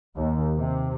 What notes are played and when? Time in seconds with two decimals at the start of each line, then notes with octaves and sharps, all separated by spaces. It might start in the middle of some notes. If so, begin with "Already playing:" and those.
0.16 D#2
0.57 C3